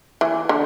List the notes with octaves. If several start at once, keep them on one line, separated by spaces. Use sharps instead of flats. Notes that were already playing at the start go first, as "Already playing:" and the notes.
E3
D3